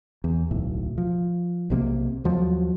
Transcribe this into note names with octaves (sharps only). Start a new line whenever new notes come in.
E2
D1 B1 A2
F3
B1 C3 F#3 A#3
D#2 F3 F#3